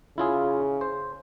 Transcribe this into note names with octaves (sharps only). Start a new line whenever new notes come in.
C#3 E4 F4 G#4
C5